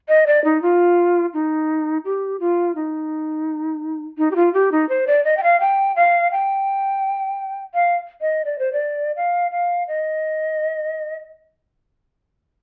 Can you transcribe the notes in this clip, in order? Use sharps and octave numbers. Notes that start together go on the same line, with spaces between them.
D#5
D5
D#4
F4
D#4
G4
F4
D#4
D#4
G4
F4
G4
D#4
C5
D5
D#5
G5
F5
G5
F5
G5
F5
D#5
D5
C5
D5
F5
F5
D#5